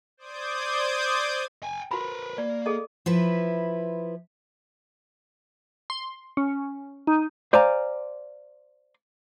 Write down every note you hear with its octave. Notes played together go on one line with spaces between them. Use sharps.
C5 D5 D6 D#6 G6 G#6
G5 G#5
F#4 A#4 B4 B5
A#3 D5
G#4 A4 D#5
F3 E4 B4
C6
C#4
D#4
C5 D5 F5 G#5 A#5